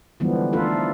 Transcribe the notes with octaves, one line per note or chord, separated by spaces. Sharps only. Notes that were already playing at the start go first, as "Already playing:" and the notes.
D3 E3 F3 G3 G#3 B3
A3 D4 D#4 F4 A4 B4